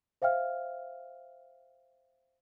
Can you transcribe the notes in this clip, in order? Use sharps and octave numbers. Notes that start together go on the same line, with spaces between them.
C5 E5 F5 G5 F6